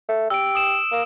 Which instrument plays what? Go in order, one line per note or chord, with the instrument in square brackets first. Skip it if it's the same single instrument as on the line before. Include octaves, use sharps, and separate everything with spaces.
[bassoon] A3
[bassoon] G4 [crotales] E6 D7
[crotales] D#6 E7
[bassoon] A#3